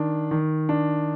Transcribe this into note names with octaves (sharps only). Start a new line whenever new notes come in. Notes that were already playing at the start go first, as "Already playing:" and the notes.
Already playing: D#3 D4
D#3
D4